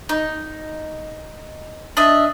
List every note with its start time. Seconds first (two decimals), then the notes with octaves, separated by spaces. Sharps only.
0.09 D#4
1.97 D4 D#5 E5